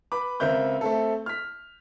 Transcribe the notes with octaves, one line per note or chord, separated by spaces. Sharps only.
B4 B5 D6
C#2 C4 A#4 E5 F#6 G6
A3 C4 A4
F6 B6